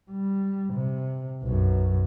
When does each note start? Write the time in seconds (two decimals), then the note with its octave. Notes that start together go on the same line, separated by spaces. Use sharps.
0.11 G3
0.73 C3
1.43 B1 F#2